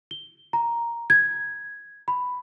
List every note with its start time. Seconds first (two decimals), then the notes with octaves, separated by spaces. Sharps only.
0.11 G7
0.53 A#5
1.10 G#6
2.08 B5